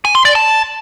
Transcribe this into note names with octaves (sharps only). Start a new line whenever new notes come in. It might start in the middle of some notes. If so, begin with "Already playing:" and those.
G#5
C6
D5
A5